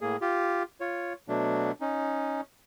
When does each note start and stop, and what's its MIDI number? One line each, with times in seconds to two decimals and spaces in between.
0.01 0.17 45
0.01 0.17 58
0.01 0.17 68
0.21 0.63 65
0.21 0.63 67
0.80 1.13 65
0.80 1.13 73
1.28 1.71 47
1.28 1.71 54
1.28 1.71 57
1.28 1.71 62
1.81 2.41 61
1.81 2.41 63